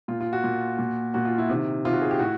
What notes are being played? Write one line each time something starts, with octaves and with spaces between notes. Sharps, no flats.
A#2 F4
F4
F#4
A#2
A#2
A#2 F#4
F4
E4
C3 D#3
C3 D#3 F4
F#4
G#4
G4
A2 F#4